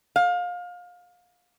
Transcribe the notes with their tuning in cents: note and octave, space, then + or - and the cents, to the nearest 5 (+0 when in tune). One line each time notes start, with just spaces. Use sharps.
F5 +25